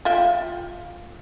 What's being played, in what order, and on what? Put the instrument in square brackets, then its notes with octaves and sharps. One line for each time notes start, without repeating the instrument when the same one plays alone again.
[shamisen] F4 E5 G5